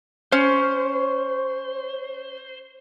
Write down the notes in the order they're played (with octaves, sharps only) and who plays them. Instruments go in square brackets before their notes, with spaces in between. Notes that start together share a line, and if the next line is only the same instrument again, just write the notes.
[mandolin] C#4 [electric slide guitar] C5